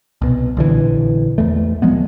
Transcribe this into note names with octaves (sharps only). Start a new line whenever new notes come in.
C2 B2
A#1 D3 E3
E2 E3 A3
D1 F3 G#3 B3